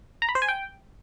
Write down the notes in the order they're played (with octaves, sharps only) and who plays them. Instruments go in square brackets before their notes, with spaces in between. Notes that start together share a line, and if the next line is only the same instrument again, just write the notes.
[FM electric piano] A#5
B5
C5
G#5
G5